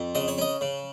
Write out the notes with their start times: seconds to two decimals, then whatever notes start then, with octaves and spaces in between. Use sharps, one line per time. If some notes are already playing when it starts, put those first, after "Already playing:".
Already playing: F2
0.15 C#3 D#5
0.28 C#5
0.38 C#4 D#5
0.61 C#3